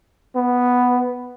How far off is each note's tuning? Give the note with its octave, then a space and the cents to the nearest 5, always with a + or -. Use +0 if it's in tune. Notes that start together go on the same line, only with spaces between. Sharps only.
B3 +0